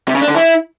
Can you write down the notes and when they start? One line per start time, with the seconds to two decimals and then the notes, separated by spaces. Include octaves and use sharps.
0.08 C3
0.15 C#3
0.21 D4
0.28 D3
0.35 E4